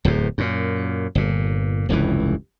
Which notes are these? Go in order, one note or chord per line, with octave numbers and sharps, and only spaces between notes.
D1 E2 A2
F#2 A#2
G1 A#2
F1 C#2 G2 E3